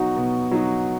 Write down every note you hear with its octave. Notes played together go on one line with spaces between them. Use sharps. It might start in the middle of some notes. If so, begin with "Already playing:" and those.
Already playing: B2 F#3 D#4 F#4
B2
F#3 D#4 F#4